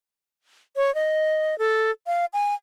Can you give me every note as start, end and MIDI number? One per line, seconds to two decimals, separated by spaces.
0.76 0.93 73
0.95 1.58 75
1.59 1.91 69
2.07 2.26 77
2.33 2.54 80